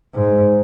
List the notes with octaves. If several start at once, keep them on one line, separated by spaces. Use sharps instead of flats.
G#2